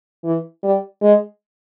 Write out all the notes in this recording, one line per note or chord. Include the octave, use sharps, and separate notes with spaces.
E3
G3
G#3